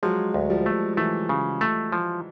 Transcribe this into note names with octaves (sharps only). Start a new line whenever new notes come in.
F3 F#3 G#3
D2
F3 G3
A3
E3 F#3 A3
C#3
A3
F3